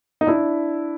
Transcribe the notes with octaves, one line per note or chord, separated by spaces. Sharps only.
D#4
D4 E4